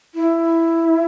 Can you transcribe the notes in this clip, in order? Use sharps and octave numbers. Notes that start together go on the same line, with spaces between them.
E4